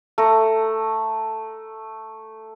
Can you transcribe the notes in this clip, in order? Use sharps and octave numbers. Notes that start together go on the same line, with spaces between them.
A3 A#5